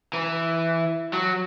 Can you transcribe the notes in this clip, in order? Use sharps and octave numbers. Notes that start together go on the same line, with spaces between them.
E3
F#3